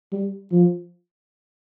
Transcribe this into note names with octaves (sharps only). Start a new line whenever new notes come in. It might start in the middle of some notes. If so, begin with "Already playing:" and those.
G3
F3